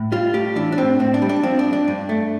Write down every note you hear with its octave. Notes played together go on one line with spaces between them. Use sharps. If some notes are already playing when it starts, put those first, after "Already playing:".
Already playing: A2
G3 F4
A2 G4
E3 D4
D4
A2 C4
A2 C4
D4
G3
D4
F3 C4
D4
G2
D4
G2
A3